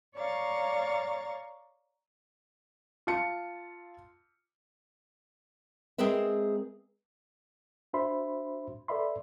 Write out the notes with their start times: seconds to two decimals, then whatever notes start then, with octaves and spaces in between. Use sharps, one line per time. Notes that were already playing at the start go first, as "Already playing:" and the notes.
0.15 C#5 D5 F5 A#5 C#6 A6
3.07 F4 A5 C#7
5.98 G#3 C4 G#4 A#4 B4 E5
7.93 D4 F#4 C5 E5 B5 C6
8.88 A4 B4 D5 E5 B5 C6